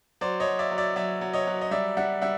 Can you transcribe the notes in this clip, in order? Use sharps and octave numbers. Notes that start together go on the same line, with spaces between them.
F#3 C5 D5
C#5 D#5
F#3
D5 E5
F#3
D5 E5
F#3 D5 E5
F#3
C#5 D#5
F#3
D#5
G3 D5 E5
G3 E5 F#5
G3 E5 F#5